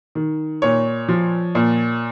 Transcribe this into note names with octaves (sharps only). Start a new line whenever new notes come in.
D#3
A#2 C#5
F3
A#2